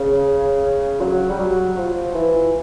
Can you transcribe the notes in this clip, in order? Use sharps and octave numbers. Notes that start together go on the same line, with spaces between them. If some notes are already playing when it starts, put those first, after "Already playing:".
Already playing: C#3
F#3
G3
F#3
F3
E3